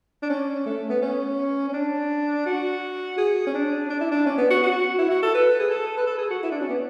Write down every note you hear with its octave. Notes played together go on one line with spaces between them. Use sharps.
D4
C#4
A3
B3
C#4
C#4
D4
F#4
G#4
C#4
D4
D4
E4
D4
C#4
B3
F#4
F#4
E4
F#4
A4
B4
G#4
A4
B4
A4
G#4
F#4
E4
D4
C#4
B3